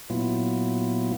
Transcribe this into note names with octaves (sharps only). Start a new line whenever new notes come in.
A#2 F#3 B3 E4 F4